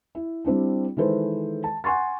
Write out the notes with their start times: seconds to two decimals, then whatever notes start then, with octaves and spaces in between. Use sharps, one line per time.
0.15 E4
0.45 G3 C4 D4 E4
0.97 D#3 E3 G#3 A4 B4 C5
1.64 A5
1.84 F#5 G#5 C6 C#6 A6